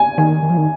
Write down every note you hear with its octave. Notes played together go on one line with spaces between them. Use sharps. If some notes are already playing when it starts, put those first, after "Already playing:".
Already playing: G#5
D#3 G#5
D#3
F3
D#3